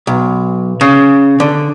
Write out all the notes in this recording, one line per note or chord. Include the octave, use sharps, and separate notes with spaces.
B1
C#3
D3